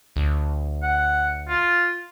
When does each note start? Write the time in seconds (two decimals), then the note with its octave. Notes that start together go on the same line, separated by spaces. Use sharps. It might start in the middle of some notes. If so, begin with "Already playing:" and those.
0.16 D2
0.83 F#5
1.48 F4